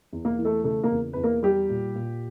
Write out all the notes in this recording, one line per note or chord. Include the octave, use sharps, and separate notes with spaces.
E2
A#3 A#4
E3
A3 A4
C#3 A3 A4
A#3 A#4
E2
E2 B4
A#3 A#4
G3 G4
A#2
A#2